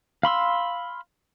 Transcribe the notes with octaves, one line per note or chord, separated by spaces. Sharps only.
F5 B5 C6 E6